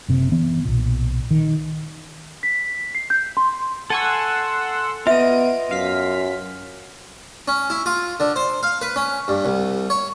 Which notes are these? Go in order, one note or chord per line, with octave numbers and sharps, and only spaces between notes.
F#1 C3
E3 B3
B1 A#2
D#3
B6
C7
G6
C6
A4 F#5 G#5 C6 C#6 E6
B3 F4 D#5 E5 D7 D#7
F#2 F5 B6
C#4
E4
F4
D3
C5
F5
B4
C#4
G2
C2
C#5